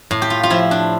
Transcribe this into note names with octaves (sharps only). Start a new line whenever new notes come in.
A2
G4
F4
F4
F3 E4
D4